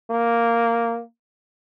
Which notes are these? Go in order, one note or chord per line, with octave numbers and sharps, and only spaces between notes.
A#3